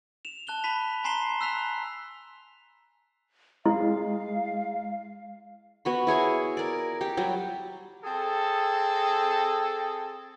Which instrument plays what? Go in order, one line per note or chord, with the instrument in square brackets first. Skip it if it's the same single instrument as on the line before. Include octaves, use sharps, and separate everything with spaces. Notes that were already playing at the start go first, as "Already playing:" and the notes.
[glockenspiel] E7 F7
A5 F#6 F7 G7
A5 B5 B6
G#5 A#5 C6 C7 E7 G7
E6 F#6 B6 F7
[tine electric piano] G#3 [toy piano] E4 [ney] F5
[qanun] B3 F#4 B5
E4 G#4 C#5 G#5
A#4 D5
G4
F#3 G3
[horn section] C4 G#4 A4